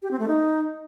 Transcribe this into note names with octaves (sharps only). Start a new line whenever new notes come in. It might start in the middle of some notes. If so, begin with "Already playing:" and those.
G4
C4
A3
D#4